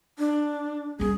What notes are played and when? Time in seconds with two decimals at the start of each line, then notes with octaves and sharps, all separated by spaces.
0.19 D4
1.00 G3 C#4 G#4